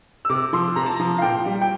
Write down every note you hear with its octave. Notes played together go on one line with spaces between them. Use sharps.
E6
C3 D6
F3 C6
C3 A#5
A5
F3 A#5
F5
A#2 G5
G3
G5